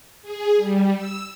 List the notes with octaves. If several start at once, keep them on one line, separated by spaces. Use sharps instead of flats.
G#4
G3
E6